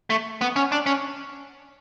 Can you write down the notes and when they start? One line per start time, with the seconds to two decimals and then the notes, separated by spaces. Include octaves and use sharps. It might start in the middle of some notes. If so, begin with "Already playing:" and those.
0.10 A3
0.41 B3
0.56 C#4
0.72 D4
0.86 C#4